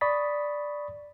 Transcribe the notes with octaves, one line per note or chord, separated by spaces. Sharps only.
D5 B5 C#6 D#6 A6 B6